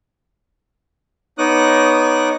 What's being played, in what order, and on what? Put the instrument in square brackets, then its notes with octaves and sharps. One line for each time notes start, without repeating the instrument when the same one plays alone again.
[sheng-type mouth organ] B3 D#4 C#5 D6 D#6 F#6